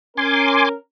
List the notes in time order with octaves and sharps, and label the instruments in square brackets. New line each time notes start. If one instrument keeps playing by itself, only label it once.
[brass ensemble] C#4 A#4 [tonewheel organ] G#5 C6 D6